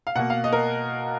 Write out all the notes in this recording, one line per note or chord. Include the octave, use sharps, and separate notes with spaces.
F5
B2 A#3 F#5
F5
D#5
A#4